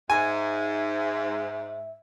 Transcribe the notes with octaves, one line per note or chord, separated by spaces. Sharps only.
G#2 E5 G#5